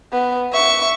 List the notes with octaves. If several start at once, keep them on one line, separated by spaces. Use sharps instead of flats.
B3
E5 C#6